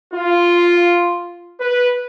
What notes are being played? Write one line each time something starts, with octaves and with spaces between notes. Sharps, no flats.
F4
B4